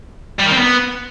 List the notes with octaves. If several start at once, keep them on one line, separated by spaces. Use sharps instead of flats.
G3
D#3
C4
B3